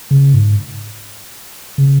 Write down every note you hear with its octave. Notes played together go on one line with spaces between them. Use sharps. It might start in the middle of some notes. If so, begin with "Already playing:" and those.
C#3
G#2
C#3